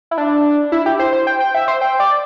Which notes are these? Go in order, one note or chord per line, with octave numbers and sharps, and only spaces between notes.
E4
D4
E4
G4
C5
C5
G5
G5
E5
C5
G5
D5